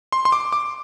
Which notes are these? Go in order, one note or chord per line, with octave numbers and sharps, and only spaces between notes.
C6
C6
D6
D6